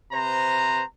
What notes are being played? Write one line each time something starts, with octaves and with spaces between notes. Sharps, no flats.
C3 B4 C5 A#5